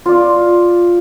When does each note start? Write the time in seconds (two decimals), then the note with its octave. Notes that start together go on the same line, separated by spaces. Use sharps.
0.06 F4 D5